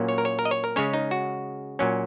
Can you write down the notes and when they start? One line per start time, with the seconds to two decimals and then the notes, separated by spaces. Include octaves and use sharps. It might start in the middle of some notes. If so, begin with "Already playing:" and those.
Already playing: A#2 F#3 A#3 C#4
0.09 C#5
0.18 A#4
0.25 C#5
0.39 A#4
0.45 D#5
0.51 C#5
0.64 A#4
0.76 C#3 G#3 C#4 C#5
0.93 D#4
1.11 F#4
1.79 A#2 F#3 C#4